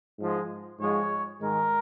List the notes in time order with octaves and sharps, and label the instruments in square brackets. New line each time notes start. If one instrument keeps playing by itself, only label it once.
[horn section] G#2 F3 G#3
G#2 F3 G#3 C#5
G#2 D#3 G#3 A#4